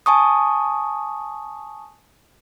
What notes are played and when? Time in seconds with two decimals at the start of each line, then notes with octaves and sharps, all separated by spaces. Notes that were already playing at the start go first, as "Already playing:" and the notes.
0.06 G#5 A5 C#6 D#6